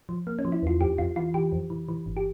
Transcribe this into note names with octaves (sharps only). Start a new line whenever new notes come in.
F3
A#3
C#4
F3
E4
E2 F4
F2 G4
F2 F4
E3 F4
E3 G4
F2
E3
E3
G1
G4